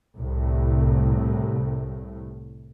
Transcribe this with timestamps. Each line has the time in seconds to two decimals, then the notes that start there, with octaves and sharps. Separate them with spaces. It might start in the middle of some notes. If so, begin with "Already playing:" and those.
0.16 C2 A2